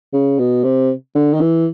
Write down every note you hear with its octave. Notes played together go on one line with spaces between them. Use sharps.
C#3
B2
C3
D3
D#3
E3